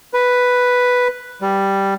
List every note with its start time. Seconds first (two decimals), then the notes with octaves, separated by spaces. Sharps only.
0.14 B4
1.42 G3